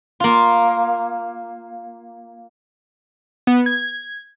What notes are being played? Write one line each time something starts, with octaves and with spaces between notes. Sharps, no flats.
A#3 F4
B3
G#6